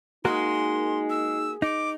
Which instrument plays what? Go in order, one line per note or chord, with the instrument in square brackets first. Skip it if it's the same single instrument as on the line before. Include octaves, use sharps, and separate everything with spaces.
[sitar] G#3 [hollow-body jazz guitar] A#3 F#4 A#4 [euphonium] D#4 [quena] C6
[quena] E6
[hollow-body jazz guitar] D#4 [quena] D6